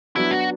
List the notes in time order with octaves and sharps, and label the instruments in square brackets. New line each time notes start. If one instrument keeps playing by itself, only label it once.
[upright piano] F#3 B3 D4 F#4 [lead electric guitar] E4
[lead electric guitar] F#4